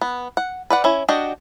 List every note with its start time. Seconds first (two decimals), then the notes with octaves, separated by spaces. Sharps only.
0.01 B3
0.37 F#5
0.70 B4 D5 F#5
0.84 C#4 E4
1.09 D4 F#4 G4 D#5